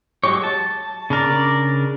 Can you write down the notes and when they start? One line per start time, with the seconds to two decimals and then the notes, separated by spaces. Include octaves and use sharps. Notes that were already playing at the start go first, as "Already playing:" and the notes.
0.24 F#3 G#3 G4 C#5
0.44 A5
1.10 C#3 D4 A#4 D5